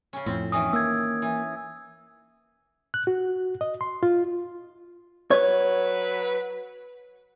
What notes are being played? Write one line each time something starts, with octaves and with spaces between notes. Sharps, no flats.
C#3 C#4
F2 A2 C4
D#3 E3 C#4 D#6
A#3 E6 G#6
E3
F#6
F#4
D#5
C6
F4
F#3 B4 C#5